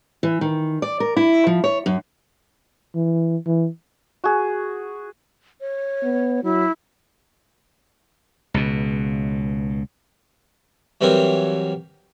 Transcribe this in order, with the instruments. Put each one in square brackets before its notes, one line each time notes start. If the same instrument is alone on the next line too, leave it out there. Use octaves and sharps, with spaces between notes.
[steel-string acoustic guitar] E3
D#3
D5
A#4
E4
F3
C#5
F#2
[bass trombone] E3
E3
[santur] F#4 G#4
[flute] C#5
[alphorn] B3
[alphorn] F#3 [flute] E4
[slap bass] C#2 B2
[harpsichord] E3 F#3 G3 C4 A#4 C#5